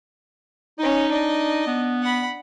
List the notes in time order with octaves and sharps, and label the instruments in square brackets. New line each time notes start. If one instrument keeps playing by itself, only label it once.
[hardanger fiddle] C#4 D#5 [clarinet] D#4
[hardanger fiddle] D4 D#5
[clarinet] B3
[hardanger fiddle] F#5 B5